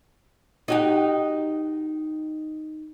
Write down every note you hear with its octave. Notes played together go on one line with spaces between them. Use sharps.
D#4 F#4 G4